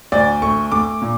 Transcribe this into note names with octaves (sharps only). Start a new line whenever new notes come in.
D2 D5
A3 C#6
A3 D6
A#2